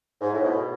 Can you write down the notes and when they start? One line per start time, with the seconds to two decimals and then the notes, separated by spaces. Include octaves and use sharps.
0.21 G#2
0.32 A2
0.42 B2